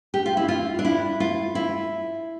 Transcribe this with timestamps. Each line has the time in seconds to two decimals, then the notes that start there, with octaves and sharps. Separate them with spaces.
0.14 G4
0.26 F4
0.37 E4
0.48 F4
0.79 D4
0.85 E4
1.20 F4
1.55 E4